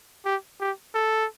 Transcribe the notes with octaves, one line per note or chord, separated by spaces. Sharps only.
G4
G4
A4